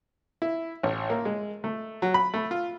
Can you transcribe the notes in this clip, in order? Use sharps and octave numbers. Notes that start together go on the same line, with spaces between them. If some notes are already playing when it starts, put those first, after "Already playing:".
E4
A1
A#3
G#3
A3
F#3
B5
A3
F4